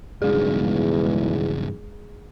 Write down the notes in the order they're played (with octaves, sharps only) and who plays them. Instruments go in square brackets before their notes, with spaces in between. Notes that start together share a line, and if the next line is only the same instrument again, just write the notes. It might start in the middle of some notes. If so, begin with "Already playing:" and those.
[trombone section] B1 E2 [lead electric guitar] G2 C#3 [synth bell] G#3 G#4